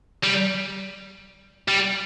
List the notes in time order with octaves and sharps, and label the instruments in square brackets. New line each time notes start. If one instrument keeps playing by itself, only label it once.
[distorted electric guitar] G3
G3